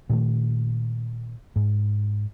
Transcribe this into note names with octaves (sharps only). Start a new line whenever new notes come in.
A#2 D#3 A3
G#2